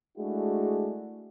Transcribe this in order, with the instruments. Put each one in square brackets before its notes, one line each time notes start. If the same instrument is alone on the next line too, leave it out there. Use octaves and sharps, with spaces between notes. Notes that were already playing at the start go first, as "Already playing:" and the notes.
[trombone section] G#3 A3 D4 E4 F#4 G#4